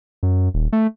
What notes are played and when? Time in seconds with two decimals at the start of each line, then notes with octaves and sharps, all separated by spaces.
0.23 F#2
0.54 D#1
0.73 A3